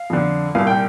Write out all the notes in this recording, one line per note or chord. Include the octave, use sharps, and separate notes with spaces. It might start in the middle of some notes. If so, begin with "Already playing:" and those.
Already playing: F5
F2 D3
C2 A#2 F5
G5